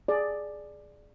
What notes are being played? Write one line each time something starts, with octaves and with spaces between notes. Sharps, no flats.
G#4 D5